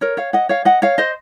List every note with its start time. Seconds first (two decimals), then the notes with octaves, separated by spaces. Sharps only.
0.01 A#4 C#5
0.17 C#5 F5
0.33 D#5 F#5
0.49 C#5 F5
0.65 D#5 F#5
0.82 C#5 F5
0.98 C5 D#5